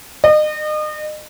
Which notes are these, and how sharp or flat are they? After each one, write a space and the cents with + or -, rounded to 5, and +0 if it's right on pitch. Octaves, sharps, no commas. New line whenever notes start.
D#5 -35